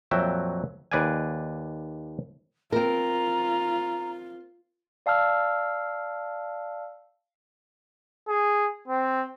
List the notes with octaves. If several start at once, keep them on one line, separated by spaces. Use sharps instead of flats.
F2 A#2 F#3 F#4 E5 G5
D#2 B4 D5 F5 G#5
C4 F4 A#4 A#5
D5 F5 A5 E6 F6
G#4
C4